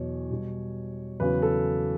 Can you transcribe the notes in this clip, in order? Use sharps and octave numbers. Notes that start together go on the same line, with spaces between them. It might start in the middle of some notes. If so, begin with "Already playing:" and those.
Already playing: E2 B2 F#3 C#5
B2 G3
E2 C#3 F#3 B4
A4